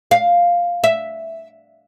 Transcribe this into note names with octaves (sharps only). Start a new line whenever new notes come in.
F5
E5